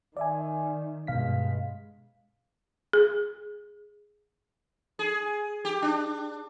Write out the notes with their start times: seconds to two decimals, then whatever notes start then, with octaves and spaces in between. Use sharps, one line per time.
0.17 D#3 D5 E5 G#5
1.07 G2 B2 G#3 F5 B6
2.93 G#4
4.99 G#4
5.65 G4
5.82 D4